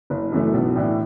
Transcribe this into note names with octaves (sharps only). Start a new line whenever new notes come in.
F#1
F#2 E3 A3
B1
A2 E3 D4